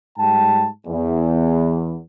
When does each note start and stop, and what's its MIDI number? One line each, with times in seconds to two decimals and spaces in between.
0.18 0.67 44
0.18 0.67 55
0.18 0.67 79
0.18 0.67 81
0.87 1.98 40